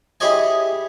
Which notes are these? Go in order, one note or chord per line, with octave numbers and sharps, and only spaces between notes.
E4 G4 G#4 C#5 D#5 G#5